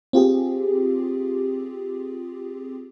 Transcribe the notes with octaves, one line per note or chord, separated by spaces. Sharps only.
C4 F4 G4 G#4